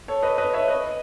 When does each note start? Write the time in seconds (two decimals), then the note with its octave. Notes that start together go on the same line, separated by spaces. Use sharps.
0.08 A4 C#5
0.22 B4 D#5
0.38 B4 D#5
0.53 C#5 E5
0.68 B4 D#5